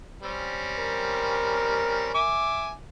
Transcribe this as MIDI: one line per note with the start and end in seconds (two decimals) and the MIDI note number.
0.23 2.10 55
0.23 2.10 60
0.23 2.10 61
0.77 2.41 70
2.14 2.72 76
2.14 2.72 80
2.14 2.72 86